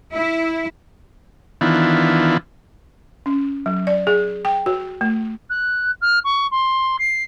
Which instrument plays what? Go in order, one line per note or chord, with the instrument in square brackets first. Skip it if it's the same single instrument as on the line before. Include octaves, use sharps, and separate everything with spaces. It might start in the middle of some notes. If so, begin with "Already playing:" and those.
[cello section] E4
[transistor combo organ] D#3 E3 B3 D4 E4 F4
[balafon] C#4
F#3
D5
G#4
G5
F#4
A3
[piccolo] F#6
F6
C#6
C6
C7